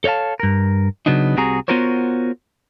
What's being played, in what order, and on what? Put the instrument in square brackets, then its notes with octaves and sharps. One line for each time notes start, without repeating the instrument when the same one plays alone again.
[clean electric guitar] A4 C#5 D5 F5 A5
G2 A#4
C#3 F#3 B3 D4 D#4
C2 C3 F#4 G#4 A#5
B3 F4 F#4 A#4 C5 C#5